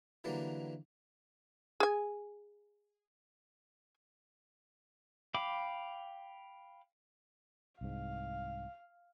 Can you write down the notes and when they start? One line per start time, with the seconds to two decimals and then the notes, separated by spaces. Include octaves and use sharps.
0.24 D3 E3 F#3 G3 A#3
1.80 G#4 G#5
5.35 F5 G5 B5 D6
7.81 C2 G#2 F5